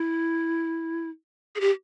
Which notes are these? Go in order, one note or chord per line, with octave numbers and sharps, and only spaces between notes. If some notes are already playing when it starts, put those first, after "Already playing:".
Already playing: E4
G#4
G4